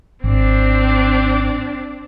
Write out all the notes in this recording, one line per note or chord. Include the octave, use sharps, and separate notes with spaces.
G#1 C4 D4